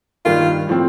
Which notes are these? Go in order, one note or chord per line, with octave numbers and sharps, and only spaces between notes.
G2 D#3 A#3 F4
A2 F3 C4